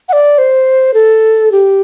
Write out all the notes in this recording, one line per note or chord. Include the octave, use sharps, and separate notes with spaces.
F#5
D5
C5
A4
G4